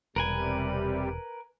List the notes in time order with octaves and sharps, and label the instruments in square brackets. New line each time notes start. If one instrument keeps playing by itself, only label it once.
[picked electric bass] E1 [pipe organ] C3 G3 [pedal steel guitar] A#4 B4 G#5